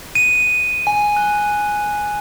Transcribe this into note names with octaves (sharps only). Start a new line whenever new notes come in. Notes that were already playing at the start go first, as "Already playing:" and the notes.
D#7
G#5
F#6